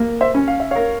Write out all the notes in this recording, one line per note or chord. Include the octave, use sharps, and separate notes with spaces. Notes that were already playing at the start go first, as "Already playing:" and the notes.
Already playing: A#3
C5 E5
C#4
F5
E5
A#4 C#5 F5